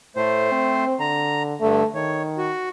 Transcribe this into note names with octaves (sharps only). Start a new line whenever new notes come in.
A2 A3 C5
C4
D3 A#5
G2 D3 A3
D#3 C#5
F#4